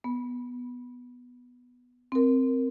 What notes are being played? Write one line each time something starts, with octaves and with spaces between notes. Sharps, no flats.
B3
C4 A#4